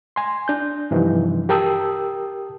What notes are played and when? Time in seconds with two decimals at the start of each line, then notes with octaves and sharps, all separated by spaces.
0.16 G#5 C6
0.48 D4 G6
0.91 G2 C3 E3 F3 D#4
1.49 G4 A#4 G5 A5 D#6 E6